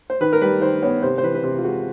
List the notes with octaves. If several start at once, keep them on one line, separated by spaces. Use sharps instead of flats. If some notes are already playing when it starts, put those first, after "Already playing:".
C5
D#3 B4
A#4
G3 B4
D#3 C5
B3 C#5
C3 C5
C5
E3 B4
B4
C3 C5
F4
G#3 F#4